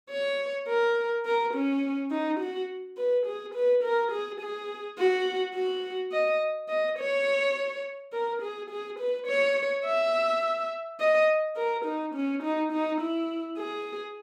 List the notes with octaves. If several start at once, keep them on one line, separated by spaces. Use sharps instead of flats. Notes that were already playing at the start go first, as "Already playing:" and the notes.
C#5
A#4
A#4
C#4
D#4
F#4
B4
G#4
B4
A#4
G#4
G#4
F#4
F#4
D#5
D#5
C#5
A#4
G#4
G#4
B4
C#5
E5
D#5
A#4
D#4
C#4
D#4
D#4
E4
G#4